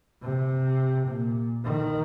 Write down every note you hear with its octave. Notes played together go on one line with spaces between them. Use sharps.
C3
A#2
D#3